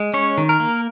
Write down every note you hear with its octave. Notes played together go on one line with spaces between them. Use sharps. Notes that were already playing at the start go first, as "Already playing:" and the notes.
Already playing: G#3
C#4 C#5
D#3
A#4
A#3